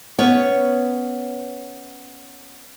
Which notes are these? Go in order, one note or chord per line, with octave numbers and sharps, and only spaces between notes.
B3 C#4 C#5